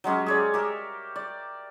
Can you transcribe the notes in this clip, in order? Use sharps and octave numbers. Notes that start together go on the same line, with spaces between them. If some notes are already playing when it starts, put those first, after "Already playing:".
F#3 G#3 C#4 G4
G#4 C#5 D5
G4 A#4 E5
D5